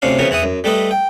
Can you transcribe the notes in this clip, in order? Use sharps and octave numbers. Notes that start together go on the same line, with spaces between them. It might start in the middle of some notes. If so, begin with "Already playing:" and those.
D2 C3 C#4 D4 F5
C#3 E3 F3 B3 C#4 A#4
E2 E3 E4 F#5 D#6
F#2
G3 A3 A4 B4 D#5
G5